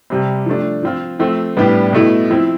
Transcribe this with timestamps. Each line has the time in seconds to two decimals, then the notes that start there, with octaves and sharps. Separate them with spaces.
0.10 C3 G3 C4 G4
0.46 F3 A3 D4
0.83 F3 C4 F4
1.19 F3 A3 C4
1.57 A2 G3 B3 D4 G4
1.92 B2 A3 E4
2.29 F3 C4 E4